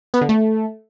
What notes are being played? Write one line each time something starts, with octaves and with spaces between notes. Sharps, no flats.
B3
D3
A3